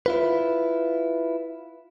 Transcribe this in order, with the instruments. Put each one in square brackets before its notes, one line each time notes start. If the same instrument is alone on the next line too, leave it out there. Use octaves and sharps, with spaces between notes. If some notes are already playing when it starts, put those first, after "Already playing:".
[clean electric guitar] E4 F4 B4